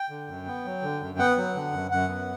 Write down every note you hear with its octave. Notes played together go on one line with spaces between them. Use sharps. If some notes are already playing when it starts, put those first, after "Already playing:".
Already playing: G5
D3
F#2
B3
F#3
D3
F#2
B3 F#5
F#3
D3
F#2
F#2 F#5
B3